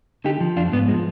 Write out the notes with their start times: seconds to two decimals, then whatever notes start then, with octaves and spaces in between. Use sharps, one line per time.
0.24 D3 D#4 G4
0.41 F3
0.57 F2 D4 F4
0.73 G#2 B3
0.88 F3 G#3